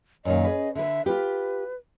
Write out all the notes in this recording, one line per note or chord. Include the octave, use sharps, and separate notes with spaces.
F#2 A#2 D#3 D#5
C#4 G#4 B4
D3 B4 E5
F4 G4 B4